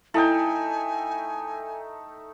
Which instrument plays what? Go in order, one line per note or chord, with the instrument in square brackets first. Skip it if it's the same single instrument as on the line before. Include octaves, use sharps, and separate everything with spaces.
[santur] A3 D#4 G5 [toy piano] E4 [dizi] G#5